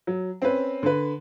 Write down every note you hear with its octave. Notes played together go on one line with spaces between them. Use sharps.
F#3
C4 C#4 B4
D3 B4